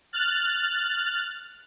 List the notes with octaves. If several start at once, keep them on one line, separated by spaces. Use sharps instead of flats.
F6 F#6 A6